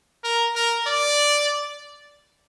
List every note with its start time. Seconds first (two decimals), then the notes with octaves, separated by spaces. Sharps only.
0.24 A#4
0.55 A#4
0.87 D5